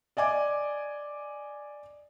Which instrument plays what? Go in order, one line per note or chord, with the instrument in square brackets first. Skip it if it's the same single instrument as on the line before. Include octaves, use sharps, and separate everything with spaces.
[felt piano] D5 D#5 G#5 D6